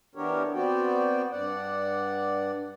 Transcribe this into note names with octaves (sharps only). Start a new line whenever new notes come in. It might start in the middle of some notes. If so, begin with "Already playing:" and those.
E3 B3 D4 G4 A#4 C#5
B3 C4 F#4 D5 G5
G2 D5 F#5